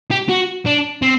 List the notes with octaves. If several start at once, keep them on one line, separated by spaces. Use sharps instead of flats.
G4
F#4
D4
C4